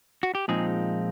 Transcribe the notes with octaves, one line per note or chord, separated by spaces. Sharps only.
F#4
G4
A#2 F3 G#3 C4 D#4 G#4